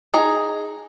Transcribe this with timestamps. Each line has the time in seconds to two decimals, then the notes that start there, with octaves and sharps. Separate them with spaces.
0.14 D#4 G#4 A#5